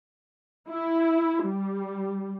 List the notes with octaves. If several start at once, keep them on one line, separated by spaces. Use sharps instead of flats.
E4
G3